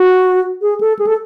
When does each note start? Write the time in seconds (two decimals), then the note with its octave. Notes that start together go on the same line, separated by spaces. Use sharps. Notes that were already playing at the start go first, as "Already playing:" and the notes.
Already playing: F#4
0.62 G#4
0.81 A4
0.99 G#4
1.07 A4